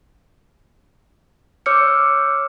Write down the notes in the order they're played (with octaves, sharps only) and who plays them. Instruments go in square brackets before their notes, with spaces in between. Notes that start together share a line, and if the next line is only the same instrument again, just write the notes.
[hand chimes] C#5 D6 E6 F6 G6 C#7